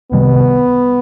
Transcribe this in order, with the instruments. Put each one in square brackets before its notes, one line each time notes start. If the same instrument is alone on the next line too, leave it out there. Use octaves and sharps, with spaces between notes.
[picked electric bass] C2 C3 D#3 G3 [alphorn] B3